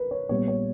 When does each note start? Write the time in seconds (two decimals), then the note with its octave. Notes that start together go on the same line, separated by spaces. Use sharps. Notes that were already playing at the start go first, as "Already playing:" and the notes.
Already playing: A#4 B4
0.11 C#5
0.29 A#2 G3 B3 C#5
0.48 C#5